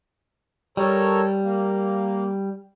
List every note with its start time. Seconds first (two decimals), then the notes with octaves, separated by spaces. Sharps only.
0.77 G3 A4 A#4 C#5
1.44 A#3